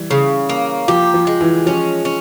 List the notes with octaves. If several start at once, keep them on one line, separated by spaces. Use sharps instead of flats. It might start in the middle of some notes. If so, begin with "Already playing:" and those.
Already playing: E3 G3
C#3
A#3
F3 G4
F3
G#3
E3
F3 C#4
C#4